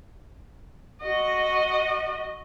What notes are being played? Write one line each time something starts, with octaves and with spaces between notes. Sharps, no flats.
F#4 D#5